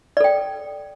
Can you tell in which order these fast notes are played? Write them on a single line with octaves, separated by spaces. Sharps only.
D5 A4 G5